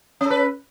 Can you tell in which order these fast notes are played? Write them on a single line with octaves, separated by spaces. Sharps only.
C#4 A4 B4